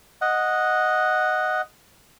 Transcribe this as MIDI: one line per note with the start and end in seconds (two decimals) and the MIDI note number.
0.21 1.62 75
0.21 1.62 78